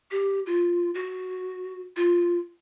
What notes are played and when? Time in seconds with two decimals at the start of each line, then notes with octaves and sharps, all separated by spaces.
0.11 G4
0.46 F4
0.95 F#4
1.96 F4